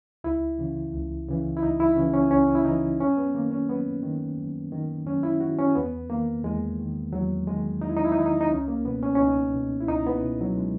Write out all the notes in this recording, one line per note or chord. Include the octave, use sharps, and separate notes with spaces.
C#2 E4
C#3 E3
C#2
C#3 E3
E4
C#2 D#4
E4
C#3 E3 C#4
C#4
C#2 C#4
E4
C#3 E3 D#4
F#2 C#4
B3
D#3 A#3
C#4
F#2 B3
D#3
F#2
D#3
F#2 C#4
E4
D#3 F#4
C#4
E2 B3
D#3 A#3
E2 G#3
D#3
E2 F#3
D#3 G#3
E2 D#4
E4
D#4
E4
D#4
D#3 E4
D#4
D#4
C#2 C#4
A#3
B2 B3
C#4
C#4
C#2 D#4
B2
E4
C#2 D#4
B3
B2
F#3
G#3